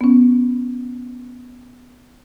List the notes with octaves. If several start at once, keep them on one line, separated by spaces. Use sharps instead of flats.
B3 C#4